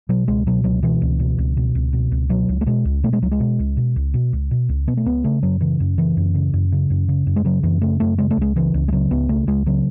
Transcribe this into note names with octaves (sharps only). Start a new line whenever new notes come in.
B2 F#3
C#2 G#3
B2 F#3
C#2 F#3
B2 E3
C#2
B2
C#2
B2
C#2
B2
C#2
B2 F#3
C#2
A3
B2 G#3
C#2
B2 A3
G#3
C#2 F#3
G#3
B2
C#2
B2
C#2
B2
C#2
B2
C#2
B2 B3
A3
C#2 B3
C#3 A3
F#2 F#3
C#3 E3
F#2
C#3 E3
F#2
C#3
F#2
C#3
F#2
C#3
F#2
G#3
C#3 F#3
F#2 E3
C#3 A3
F#2 A3
C#3 G#3
A3
C#2 G#3
C#3 E3
C#2
G#3
C#3 F#3
C#2 B3
C#3 A3
C#2 G#3
C#3 F#3